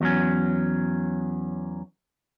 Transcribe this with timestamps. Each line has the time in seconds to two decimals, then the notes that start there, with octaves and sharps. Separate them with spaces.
0.01 E2 F#3 C#4